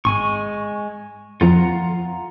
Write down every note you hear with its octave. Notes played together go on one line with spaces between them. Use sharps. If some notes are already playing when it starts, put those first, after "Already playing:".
G#1 G#3 G#5 C#6
F2 F3 F4 F#5 A#5